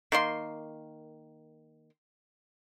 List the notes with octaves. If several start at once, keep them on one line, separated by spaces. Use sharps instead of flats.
D#3 A#3 C6